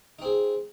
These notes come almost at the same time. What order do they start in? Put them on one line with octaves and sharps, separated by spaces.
D#4 C4 G#4